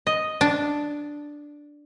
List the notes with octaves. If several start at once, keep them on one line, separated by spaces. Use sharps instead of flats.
D#5
D4